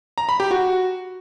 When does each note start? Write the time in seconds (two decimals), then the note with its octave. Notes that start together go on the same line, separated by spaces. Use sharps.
0.18 A#5
0.29 B5
0.40 G4
0.51 F#4